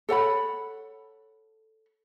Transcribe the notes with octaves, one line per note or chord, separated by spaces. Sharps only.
A4 C#5 F#5 B5